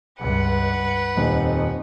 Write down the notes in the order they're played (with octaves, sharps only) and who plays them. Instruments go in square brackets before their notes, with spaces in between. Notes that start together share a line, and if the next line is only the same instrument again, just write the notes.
[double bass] C#2 G2 [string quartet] B4 F#5
[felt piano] D#1 [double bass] F2 D#4